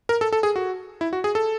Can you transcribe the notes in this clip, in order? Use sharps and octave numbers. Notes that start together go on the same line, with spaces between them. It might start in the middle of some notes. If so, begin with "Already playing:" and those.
A#4
A4
A4
G#4
F#4
E4
F#4
G#4
A4